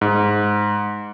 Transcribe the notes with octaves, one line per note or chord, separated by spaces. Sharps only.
G#2